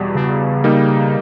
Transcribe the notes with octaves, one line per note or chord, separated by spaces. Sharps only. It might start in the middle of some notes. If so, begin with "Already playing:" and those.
Already playing: E2 B2 G3
C#3
G3 A#3 D#4